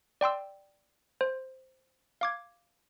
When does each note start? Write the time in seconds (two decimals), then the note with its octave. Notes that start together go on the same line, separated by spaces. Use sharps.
0.21 D5 G5 C6 E6
1.21 C5
2.21 F5 D6 G#6